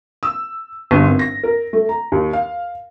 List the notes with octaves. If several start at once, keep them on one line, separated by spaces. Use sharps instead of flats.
E6
G1
G#1
A#6
A#4
A3
A#5
D#2
F5